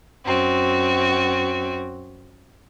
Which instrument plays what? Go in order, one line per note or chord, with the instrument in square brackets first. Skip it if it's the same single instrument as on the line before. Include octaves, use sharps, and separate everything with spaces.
[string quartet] F#2 C4 F#4